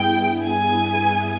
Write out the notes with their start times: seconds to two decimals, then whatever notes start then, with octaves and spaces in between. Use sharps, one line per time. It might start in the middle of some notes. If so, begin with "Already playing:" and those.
Already playing: G2 G3 B3 E4 G#4 G5
0.44 G#5